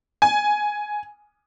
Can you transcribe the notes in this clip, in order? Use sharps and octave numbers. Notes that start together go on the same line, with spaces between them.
G#5